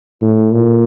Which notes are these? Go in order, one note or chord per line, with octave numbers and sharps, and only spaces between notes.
A2
A#2